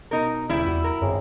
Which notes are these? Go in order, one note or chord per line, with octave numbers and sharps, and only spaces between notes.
B2 D#4 A#4
D#1 C#3 G3 E4
E2 F#4
A#4
G#1 F#2 G#4 C#5